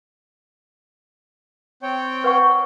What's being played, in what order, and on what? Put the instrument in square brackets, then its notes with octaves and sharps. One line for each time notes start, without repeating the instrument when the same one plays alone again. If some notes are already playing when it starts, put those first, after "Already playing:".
[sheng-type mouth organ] C4 C#5 G5
[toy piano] B4 F#5 C#6